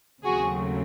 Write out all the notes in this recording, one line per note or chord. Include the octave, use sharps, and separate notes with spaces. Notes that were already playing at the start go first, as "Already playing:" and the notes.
D#2 C#3 F#3 A3 C4 F#4 G#4